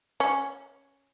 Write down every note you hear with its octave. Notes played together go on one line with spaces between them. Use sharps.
C#4